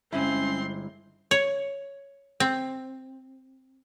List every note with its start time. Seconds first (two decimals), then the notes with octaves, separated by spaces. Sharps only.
0.12 G1 G#3 C4 C#4 E4 C6
1.31 C#5
2.40 C4